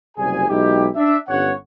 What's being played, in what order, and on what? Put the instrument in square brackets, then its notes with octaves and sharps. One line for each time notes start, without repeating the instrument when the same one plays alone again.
[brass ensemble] F#1 C3 G3 G#4 G#5
B1 G#3 D#4 E4 G4
D4 E5
G1 G2 C#4 C#5 F#5